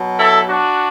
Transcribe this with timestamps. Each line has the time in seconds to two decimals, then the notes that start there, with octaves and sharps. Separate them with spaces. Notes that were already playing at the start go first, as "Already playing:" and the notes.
Already playing: B2 F#3
0.18 E4 A4
0.49 D4 F#4